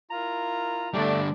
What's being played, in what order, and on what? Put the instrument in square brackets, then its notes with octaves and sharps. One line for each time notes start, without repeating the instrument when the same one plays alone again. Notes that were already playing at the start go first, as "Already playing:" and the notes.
[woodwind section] E4 A#4 A#5 [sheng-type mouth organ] F4
[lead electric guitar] D3 G3 [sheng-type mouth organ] A3 [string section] D4